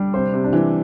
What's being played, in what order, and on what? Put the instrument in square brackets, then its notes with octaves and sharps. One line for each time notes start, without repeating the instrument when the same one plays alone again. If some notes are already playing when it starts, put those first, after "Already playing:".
Already playing: [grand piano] G3 D4 G4
[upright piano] C3 [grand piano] C5
[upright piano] C3
[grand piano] D4
[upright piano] E3